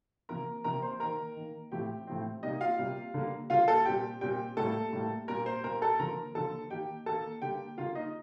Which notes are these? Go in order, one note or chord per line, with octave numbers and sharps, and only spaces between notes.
C3 F3 A#3 A#4 A#5
C3 F3 A#3 A#4 A#5
C5 C6
D#3 A#3 A#4 A#5
D#3 A#3
A2 F3 C4 G4 G5
A2 F3 C4
C3 G3 A#3 D#4 D#5
F4 F5
C3 G3 A#3
D3 G3 A#3
D3 G3 A#3 F4 F5
A4 A5
A#2 G3 C4 G4 G5
A#2 G3 C4 G4 G5
A2 G3 A#3 A4 A5
A2 G3 A#3
A#2 G3 A#3 A#4 A#5
C5 C6
A#2 G3 A#3 A#4 A#5
A4 A5
D3 F3 A#3 A#4 A#5
D3 F3 A#3 A4 A5
D#3 A#3 G4 G5
D#3 A#3 A4 A5
D3 G3 A#3 G4 G5
D3 G3 A#3 F4 F5
D#4 D#5